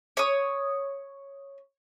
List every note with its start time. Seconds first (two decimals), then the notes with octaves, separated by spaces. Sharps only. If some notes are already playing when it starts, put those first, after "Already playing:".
0.17 C#5 D#6